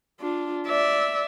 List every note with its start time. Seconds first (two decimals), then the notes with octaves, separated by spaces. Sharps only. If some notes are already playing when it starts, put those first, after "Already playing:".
0.20 D4 F4
0.67 D5 E5